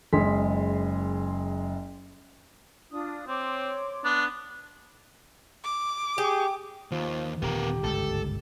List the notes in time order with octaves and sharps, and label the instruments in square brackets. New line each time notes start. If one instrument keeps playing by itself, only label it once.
[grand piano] F#1 G#3 G#4 C6 B6
[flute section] D4 F4 D#6
[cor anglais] C4 [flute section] C#5 C6 D6
[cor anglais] B3 [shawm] D4
[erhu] D6
[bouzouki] G4 [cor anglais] G#4
[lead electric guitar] D#2 [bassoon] F3
[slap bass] D#1 D3 [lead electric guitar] B3 A#4 [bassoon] G4
[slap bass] G1 C#2 G#2 [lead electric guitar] A4